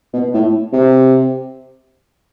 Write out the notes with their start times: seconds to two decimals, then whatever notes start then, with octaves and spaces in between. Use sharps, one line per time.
0.14 B2
0.34 A2
0.73 C3